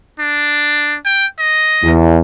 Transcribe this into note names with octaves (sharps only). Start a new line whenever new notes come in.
D4
G5
D#5
E2